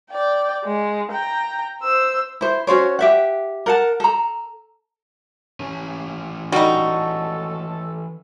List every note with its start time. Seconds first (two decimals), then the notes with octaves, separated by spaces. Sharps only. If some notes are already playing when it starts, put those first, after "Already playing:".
0.10 D5 G5
0.64 G#3
1.11 G5 A#5
1.82 C5 E6
2.41 E4 C5
2.67 C#4 F#4 C5 C#5
2.99 G4 E5 F#5
3.66 A#4 F#5 A5
4.00 A4 A#5
5.60 E3 C#4
6.52 G3 D#4 F#4 A4